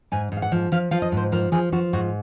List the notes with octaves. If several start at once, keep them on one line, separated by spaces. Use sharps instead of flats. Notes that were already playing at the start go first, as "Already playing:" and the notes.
G#2 G#5
G#2 F5
F#5
F3
F3 F5
F3 F5
D#5
G#2
C5
F3 A#4
F3 G#4
F3 F#4
G#2 F#4